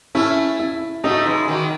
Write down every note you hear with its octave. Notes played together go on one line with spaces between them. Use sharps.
A3 C#4 E4
E4
F#3 A3 D#4
E3 G#3
D#3 F#3